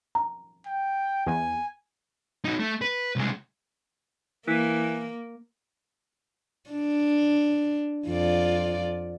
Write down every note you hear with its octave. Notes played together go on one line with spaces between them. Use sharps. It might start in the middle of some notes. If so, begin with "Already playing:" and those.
A#5
G5
E2 G#5
D#4 F#4
A3
B4
C2 G#3
E3 A#3
D4
F2 F4 D5